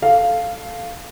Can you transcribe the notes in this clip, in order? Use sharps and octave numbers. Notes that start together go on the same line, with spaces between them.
A4 F5